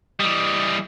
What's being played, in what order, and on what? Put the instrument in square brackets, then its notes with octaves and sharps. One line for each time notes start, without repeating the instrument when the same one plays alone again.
[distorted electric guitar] E3 G3 [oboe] D#5